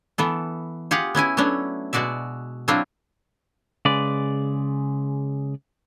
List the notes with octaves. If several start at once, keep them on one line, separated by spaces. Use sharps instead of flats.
E3 B3 A4
F4 G4 G#4 F5 F#5
B3 C#4 E4 G#5
F#3 A3 B3 C#4 D4
B2 G#3 F#4 D5 E5
F#3 C4 D4 E4 F4
C#3 G#3 B4 D5